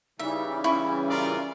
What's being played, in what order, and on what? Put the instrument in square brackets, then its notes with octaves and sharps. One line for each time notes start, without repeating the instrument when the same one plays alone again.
[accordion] C#3 E3 G3 [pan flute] D#4 [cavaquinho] E5
[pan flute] C#4 [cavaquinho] E4 C#6
[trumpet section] F4 A#4 D5